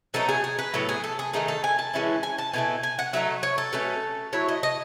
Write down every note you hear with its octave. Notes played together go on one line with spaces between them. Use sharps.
B2 F#3 A3 D#4 A4
G#4
G#4
B4
A2 F#3 B3 A4
G#4
A4
G#4
D#3 A3 D#4 G#4
A4
G#5
A5
E3 G#3 C#4 E4
G#5
A5
B2 A3 E4 G#5
G#5
F#5
F#3 A3 D#4 E5
C#5
A4
B2 A3 C#4
F#3 A3 E4 C#5
D#5
D#5